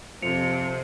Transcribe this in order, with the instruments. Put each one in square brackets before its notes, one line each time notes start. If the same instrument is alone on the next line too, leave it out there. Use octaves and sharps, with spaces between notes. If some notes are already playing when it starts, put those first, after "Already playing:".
[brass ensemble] F2 [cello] C3 [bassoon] F3 [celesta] C#7 F7